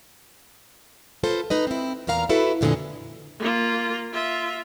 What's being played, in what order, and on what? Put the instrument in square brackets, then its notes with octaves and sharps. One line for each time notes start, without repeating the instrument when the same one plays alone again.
[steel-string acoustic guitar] F4 A4 B4 C5
D#4 B4 D#5
C4 E4
E2 A#2 A#4 F5 A#5
E4 F#4 A4 B4
F2 A#2 D3 G4 D#5 G#5
[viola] A#3 F4
F4 E5